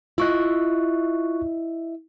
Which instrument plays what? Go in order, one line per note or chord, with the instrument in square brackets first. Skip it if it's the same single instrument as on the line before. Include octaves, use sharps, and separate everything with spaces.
[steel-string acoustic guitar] E4 D#5 [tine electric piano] F4 C#6 F#6